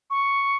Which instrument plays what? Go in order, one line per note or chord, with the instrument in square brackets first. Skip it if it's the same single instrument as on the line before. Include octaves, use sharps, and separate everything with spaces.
[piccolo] C#6